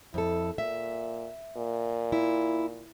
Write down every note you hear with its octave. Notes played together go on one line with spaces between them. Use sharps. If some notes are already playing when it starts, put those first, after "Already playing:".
F2 E4 A4
A#2 E5
A#2
E4